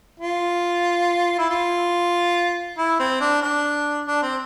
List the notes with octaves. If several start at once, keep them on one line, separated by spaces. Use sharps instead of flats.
F4
E4
F4
E4
C4
D4
D4
D4
C4